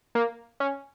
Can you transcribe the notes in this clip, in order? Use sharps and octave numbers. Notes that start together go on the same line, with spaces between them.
A#3
C#4